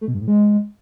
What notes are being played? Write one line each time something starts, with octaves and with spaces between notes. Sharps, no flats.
A3
B2
G2
A2
G#3